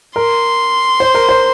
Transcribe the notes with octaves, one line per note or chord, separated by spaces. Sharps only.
A#4 C6
C5
A#4
C5